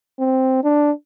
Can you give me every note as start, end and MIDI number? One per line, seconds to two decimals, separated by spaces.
0.19 0.59 60
0.64 0.91 62